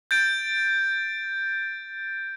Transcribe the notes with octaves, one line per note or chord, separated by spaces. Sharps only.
G6 A6 D7